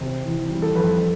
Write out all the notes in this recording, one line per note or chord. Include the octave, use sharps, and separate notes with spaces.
C3
E3
G3
A4
F2 B4